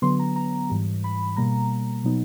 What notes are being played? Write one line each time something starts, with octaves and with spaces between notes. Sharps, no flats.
D3 F#3 B3 C6
A#5
A#5
G#2 E3 G3
B5
B2 G3 A#3 A#5
B2 F#3 B3 D#4